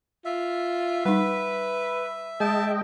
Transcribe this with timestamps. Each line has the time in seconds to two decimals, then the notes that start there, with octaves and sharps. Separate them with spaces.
0.25 F4 E5
1.05 G3 D#4 B4
2.40 G#3 D#5 G5 A5